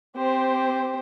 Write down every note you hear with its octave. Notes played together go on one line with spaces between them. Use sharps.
C4 G4 C5